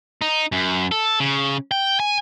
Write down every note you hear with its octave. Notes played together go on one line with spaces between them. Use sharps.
D#4
F#2
A4
C#3
G5
G#5